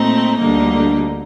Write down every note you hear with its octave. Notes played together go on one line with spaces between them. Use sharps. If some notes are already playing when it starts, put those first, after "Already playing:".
Already playing: A#2 A3 C4 D#4
D2 D3 G3 A#3 D#4